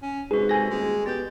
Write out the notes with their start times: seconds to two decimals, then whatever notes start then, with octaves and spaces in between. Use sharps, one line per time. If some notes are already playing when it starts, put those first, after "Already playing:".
0.02 C#4
0.31 G#2 C3 F#4 G#4 B4
0.49 F#4 A4 G#5 A#6
0.70 D#1 G#3
1.06 B2 G4 G6 A6